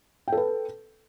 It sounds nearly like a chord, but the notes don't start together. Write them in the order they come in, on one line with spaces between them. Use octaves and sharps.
G5 A4 B4